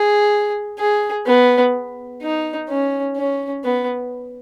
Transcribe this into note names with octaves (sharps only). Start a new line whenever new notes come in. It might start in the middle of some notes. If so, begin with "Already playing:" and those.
Already playing: G#4
G#4
B3
D#4
C#4
C#4
B3